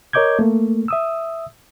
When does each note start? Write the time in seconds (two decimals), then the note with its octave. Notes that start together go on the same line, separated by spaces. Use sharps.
0.13 A#4 C#5 D#5 D6 G6 G#6
0.39 A3 A#3
0.88 E5 D#6 E6